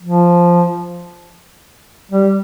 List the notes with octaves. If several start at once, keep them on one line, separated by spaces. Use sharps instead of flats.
F3
G3